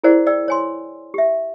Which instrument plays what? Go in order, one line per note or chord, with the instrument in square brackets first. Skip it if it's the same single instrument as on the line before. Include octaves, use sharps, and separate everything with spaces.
[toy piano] E4 G#4 A#4 C5 D5 F#5
D5 G5 E6
C#5 G#5 C6
G4 E5